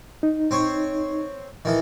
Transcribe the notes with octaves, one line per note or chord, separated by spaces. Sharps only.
D#4
C4 C5 C#5
D#3 E3 A4